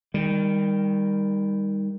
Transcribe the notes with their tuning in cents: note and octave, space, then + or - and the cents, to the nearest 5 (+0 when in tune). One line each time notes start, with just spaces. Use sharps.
D#3 +0 G3 +25